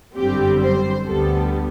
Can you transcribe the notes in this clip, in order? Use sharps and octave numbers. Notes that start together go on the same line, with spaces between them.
G1 F#2 D3 G3 C4 G4
C5
D2 D3 G3 B3 A4